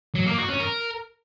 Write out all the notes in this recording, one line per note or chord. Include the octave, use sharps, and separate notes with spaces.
F#3
A#3
F#4
C#4
A#4